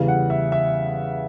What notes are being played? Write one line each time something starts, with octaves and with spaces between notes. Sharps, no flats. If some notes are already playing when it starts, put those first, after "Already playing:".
Already playing: E2 C#3 E3 G3
F#5
E5
E5